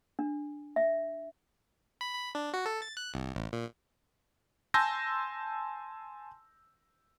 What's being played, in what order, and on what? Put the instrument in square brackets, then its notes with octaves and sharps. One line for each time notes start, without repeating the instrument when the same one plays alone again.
[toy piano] D4
E5
[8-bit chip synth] B5
B5
D4
F#4
A4
A6
F#6
C2
A1
A#2
[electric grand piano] G#5 A5 C6 E6 G6 A#6